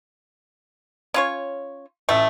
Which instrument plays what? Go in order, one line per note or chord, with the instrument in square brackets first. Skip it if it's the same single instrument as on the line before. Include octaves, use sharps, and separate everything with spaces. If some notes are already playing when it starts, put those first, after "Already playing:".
[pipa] C#4 F4 C#5
[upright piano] A1 E5 [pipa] A3